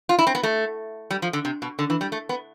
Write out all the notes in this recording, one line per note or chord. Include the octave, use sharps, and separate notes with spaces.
F4
E4
C4
B3
A3
G3
F3
D3
C3
B2
D3
E3
G3
A3
B3